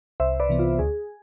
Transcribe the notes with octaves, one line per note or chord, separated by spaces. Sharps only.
C2 C5 E5
B4 D5
C3 E3 B3
F4
D2 G#4